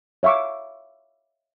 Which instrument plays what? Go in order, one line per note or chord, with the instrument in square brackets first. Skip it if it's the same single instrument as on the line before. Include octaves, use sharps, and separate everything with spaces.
[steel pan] C#5 E5 F5 C#6 D6